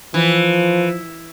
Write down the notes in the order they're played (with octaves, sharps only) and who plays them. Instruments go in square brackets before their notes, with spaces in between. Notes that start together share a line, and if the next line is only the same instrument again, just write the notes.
[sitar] E3 [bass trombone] F3